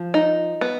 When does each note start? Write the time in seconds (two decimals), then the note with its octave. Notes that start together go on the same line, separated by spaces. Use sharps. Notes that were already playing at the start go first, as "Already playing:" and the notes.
Already playing: F3
0.14 D#4
0.61 B3